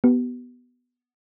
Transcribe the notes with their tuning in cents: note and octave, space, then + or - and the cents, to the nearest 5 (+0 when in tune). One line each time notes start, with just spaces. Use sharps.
B3 +0 G4 -40